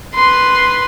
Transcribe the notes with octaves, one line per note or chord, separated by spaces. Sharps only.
B4 C6